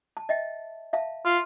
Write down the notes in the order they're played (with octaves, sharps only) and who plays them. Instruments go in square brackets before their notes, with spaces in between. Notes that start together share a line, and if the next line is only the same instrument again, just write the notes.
[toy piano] A5
D#5 E5 G5
E5 F5 A5
[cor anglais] F4